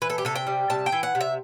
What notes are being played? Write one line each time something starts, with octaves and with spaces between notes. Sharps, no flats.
E3 B4
A4
G4
C3 A4
G5
G3
C3 A5
G5
E3
F#5
C3
E5